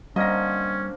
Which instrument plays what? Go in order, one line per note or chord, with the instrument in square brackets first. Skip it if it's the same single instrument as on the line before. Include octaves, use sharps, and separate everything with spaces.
[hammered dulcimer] D3 A#3 C4 [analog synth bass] G3 [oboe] C#4 [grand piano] D#5 A#6